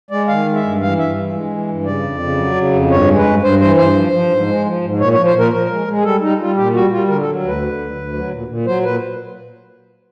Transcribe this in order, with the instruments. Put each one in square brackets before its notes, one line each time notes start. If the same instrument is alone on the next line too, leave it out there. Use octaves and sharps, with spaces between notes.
[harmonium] G#3 D5
D#3 F5
G#3
E5
G2
E3 F5
G2 E5
E3
G#3
E3
G2
C#3 D5
F2
C#3
F#3
C#3
F2
G2 C#5
G#3
B4
G2
G2 C5
E3 C5
G2 C5
F3
F3
G#2
G#3
F3
G#2
A#2 C#5
F3 C#5
C5
A#2
A#4
F3 A#4
G#3
G#3
G#4
G3 A4
G3 D#4
G3 F4
A#2 G4
G3 F#4
G3 F4
D3 A#4
F#3 A4
D2 B4
D3
D2
D2
F#3
A#2
A#2
F#3 C5
A#2 B4